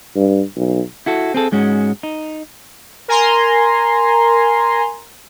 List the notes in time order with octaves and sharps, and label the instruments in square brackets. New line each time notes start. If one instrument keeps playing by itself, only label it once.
[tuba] G2
B1
[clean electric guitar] E4 F#4 A4
C4 G#4 A4
G#2 G#3 C#4 F#4
D#4
[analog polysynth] A#4 G#5 A#5 C6